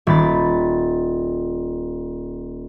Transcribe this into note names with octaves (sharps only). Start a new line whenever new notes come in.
D#1 B5 A6